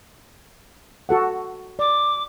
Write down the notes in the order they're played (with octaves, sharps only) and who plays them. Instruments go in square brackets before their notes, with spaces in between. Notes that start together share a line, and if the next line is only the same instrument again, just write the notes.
[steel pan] F#4 A4 F#5
[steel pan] D5 [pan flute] D6